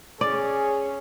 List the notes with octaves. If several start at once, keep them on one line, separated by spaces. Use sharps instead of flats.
C#4 G#4 D5